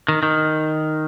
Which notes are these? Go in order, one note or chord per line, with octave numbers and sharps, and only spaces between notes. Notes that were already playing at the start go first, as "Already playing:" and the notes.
D#3
D#3